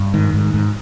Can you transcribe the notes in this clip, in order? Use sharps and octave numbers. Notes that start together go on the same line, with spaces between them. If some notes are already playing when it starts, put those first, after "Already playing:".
Already playing: G2
G#2 D#3
G#2
G#2